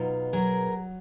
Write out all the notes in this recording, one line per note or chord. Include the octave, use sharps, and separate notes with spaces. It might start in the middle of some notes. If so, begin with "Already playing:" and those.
Already playing: B2 F#3 D#4 F4
F#3 G#4 A#4